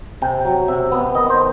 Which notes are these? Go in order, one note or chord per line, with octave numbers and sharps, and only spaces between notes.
C3 G5
F#3
C3 E5
B3
D#3 D#5
C5